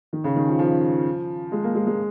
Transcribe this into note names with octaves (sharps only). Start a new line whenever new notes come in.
D#3
C#3
D#3
F3
F3
G#3
A#3
G#3
G#3